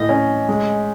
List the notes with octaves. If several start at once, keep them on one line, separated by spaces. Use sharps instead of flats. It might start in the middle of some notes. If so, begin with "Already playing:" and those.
Already playing: A2 E3 D#5
C#4
G#3